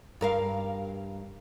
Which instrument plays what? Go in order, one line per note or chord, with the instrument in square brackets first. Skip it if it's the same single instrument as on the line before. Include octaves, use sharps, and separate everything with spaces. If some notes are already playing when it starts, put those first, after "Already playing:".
[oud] G2 A#4 F5